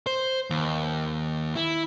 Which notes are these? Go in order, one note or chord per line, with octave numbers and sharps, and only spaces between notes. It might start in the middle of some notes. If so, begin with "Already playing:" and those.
C5
D#2
E4